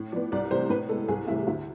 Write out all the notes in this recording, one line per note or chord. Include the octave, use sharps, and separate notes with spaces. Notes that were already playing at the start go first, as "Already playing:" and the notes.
Already playing: A2
F3 B3 D5
C2 D5
C3 E3 A3 C4 C5
A2 B4
G#3 B3 A4
C2 G#4
C3 E3 A3 E4
D2 E4